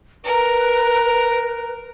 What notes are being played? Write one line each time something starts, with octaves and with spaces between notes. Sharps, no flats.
A#4 B4